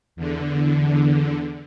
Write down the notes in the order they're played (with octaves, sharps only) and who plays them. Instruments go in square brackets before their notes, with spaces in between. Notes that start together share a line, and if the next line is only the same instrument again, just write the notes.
[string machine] E2 D3